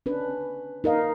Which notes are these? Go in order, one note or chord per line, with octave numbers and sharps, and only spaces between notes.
C#4 D4 B4
D#4 A#4 D#5 F5